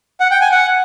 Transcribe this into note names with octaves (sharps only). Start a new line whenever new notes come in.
F#5
G5
G#5
F#5